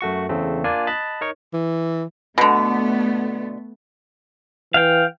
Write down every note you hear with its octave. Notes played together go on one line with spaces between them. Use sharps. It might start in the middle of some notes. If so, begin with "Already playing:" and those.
F#2 A3 F#4 C#6
E2 C#3 A3 C4
A#3 D4 F4 D5 G#5
D#5 A5 B5 F#6 A6
D#4 A#4 C#5 C#6
E3
B2 D3 A3 B3
E3 F5 G5